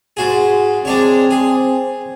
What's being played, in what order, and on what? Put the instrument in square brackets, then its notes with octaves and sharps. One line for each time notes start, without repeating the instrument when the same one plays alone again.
[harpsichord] G#2 F#4 G#4
[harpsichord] G#3 D4 C#5 [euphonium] C4
[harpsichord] G#4